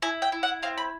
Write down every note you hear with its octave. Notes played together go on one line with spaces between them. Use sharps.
E4 G#5
G5
E4
F#5
C4 F5
B5